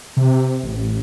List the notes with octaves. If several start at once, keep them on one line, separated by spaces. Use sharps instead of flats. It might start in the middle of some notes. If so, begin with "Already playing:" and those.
C3
A1